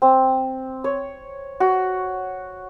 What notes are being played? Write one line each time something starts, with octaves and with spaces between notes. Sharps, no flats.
C4
C#5
F#4